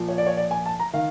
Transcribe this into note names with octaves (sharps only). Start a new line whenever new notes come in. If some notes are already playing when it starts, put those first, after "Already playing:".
Already playing: A#2 F3
C#5
D5
C#5
D5
G#5
A5
A#5
D#3 F5